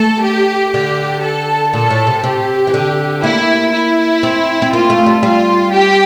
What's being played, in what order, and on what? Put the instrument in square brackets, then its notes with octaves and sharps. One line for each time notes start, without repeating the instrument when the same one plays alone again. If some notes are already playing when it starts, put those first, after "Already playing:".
Already playing: [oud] A3 [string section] A4
[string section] G4
[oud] D3 [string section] G4
[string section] A4
[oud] A#2 [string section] A4
[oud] A2
C3
[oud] C3 [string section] G4
[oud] E3
D3
[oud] A#3 [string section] E4
[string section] E4
[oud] C4
C4
[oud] A#3 [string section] F4
[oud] A3
G3
[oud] G3 [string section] F4
[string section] G4